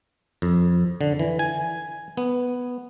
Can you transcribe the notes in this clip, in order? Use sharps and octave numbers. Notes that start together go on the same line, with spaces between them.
F2
D3
E3
G#5
B3